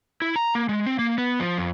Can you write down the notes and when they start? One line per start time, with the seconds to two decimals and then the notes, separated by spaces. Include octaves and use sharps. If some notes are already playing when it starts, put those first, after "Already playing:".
0.22 E4
0.36 A#5
0.55 A#3
0.69 G#3
0.86 C4
0.99 A#3
1.18 B3
1.40 F3
1.57 F2